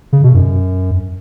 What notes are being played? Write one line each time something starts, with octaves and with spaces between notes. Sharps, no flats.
C#3
B2
F#2